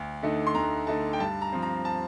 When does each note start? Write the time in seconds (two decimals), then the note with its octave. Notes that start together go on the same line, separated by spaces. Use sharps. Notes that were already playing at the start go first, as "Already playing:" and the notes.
Already playing: D2
0.22 D3 A3 D#4
0.47 C6
0.54 D2 A#5
0.87 D3 A3 D#4 A5
1.13 G5
1.19 G2 A5
1.41 A#5
1.53 F3 C4
1.62 A#5
1.85 A5